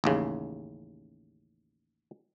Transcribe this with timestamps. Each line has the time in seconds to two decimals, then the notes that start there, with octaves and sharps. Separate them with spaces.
0.04 A1 D#2 C#3